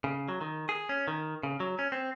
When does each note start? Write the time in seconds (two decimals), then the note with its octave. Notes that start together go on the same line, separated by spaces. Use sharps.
0.04 C#3
0.28 F#3
0.41 D#3
0.69 G#4
0.89 C#4
1.08 D#3
1.43 C#3
1.60 F#3
1.79 C#4
1.92 C4